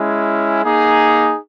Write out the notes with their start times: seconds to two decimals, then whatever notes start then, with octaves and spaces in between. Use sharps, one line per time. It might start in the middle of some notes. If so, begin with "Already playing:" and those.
Already playing: G#3 C#4 E4
0.63 A#3 D#4 G#4